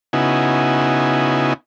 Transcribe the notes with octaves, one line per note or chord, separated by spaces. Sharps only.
C#3 B3 D#4 E4 F#4 G#5